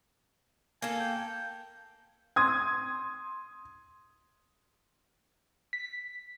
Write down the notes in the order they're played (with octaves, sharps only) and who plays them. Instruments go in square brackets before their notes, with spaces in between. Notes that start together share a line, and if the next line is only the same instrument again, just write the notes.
[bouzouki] A#3 A4 [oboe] G#5
[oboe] G5
[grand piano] C6 D#6 G#6
[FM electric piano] B6